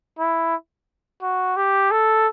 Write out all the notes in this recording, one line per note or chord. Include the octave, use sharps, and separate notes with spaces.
E4
F#4
G4
A4